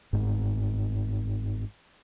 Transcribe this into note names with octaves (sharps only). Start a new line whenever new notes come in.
G1 G#2